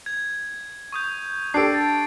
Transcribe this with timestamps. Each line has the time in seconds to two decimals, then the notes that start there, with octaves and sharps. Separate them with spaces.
0.06 G#6
0.92 C#6 D#6 G6
1.54 D4 G4 A4 C7 D7
1.74 A6